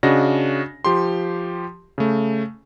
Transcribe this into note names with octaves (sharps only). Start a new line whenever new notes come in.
C#3 D4 F#4 D#5 A#6
F3 G4 C6
C#3 A3